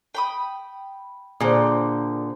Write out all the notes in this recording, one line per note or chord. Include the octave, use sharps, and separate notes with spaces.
G5 B5 D#6
A#2 D3 G#4 C5